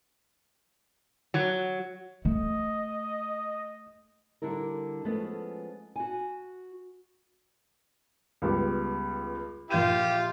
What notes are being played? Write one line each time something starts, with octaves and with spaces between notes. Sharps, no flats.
F#3
A3 D#5
D3 G3 E4 A#4
F3 G#3 A3 B3 C#4
F#4 G#5
C#2 G3 B3
A#1 F4 G4 G6 D#7